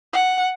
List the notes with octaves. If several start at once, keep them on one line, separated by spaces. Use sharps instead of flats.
F#5